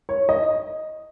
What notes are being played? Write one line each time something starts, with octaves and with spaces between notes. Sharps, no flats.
C#5
D#5